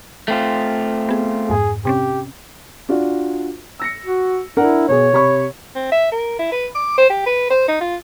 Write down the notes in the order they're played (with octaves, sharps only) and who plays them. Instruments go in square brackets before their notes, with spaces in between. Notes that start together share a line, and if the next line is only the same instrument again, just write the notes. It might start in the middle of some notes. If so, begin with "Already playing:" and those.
[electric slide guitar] A3 C4 F4
[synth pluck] B3 G#4
[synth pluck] F2 G#2 [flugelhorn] G#4
[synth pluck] C3 C4 C#4 [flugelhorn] G4
[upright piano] D4 F4 F#4
E6 A#6 C#7
[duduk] F#4
[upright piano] D4 A#4 F#5 [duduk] E4
[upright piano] B2 G#4 [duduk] C#5
[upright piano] C3 B5 C#6
[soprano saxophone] C4
E5
A#4
E4
B4
D6
C5
G4
B4
C5
D#4
F4